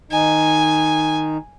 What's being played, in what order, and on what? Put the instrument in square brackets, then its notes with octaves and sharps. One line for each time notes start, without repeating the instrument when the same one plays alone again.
[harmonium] D#3 D#4 [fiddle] G#5